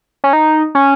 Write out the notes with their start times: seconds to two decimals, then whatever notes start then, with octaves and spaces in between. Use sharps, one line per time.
0.24 C#4
0.33 D#4
0.75 C#4